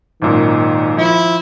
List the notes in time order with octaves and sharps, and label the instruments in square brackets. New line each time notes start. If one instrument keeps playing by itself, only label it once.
[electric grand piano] G#1 F#2 A#2 [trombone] D#3
[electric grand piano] F3 [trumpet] E4